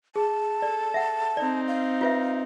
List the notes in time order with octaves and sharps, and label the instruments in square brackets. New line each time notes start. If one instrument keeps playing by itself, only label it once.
[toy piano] G#4 [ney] A5
[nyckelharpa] A4 [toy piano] D5
[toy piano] E5 F#5
[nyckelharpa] C4 D#4 [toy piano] D5
[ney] F5
[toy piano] F4 B4 E5